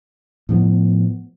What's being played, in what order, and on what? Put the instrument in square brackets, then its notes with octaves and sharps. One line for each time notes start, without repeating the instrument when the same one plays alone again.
[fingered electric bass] A2 F3 B3